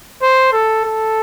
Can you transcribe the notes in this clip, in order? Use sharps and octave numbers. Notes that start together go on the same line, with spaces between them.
C5
A4
A4